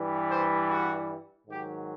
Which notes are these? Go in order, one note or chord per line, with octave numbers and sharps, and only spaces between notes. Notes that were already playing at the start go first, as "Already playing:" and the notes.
Already playing: G2 E3 G3
C5
F#4
G#2 D#3 F#3 G4